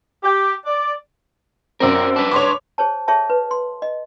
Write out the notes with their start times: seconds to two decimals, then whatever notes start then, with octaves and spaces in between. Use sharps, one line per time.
0.24 G4
0.65 D5
1.80 F#2 C4 A#4 D5
2.16 D4 B4
2.32 C#5 C6 D6
2.78 G#4 C5 C#5 A5
3.08 G#4 A4 C#5 E5 A5
3.30 B4
3.51 C6
3.82 D#5